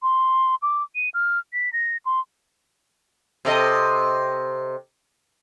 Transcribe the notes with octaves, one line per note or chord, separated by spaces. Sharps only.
C6
D6
D#7
F6
B6
A#6
C6
C3 A4 D#5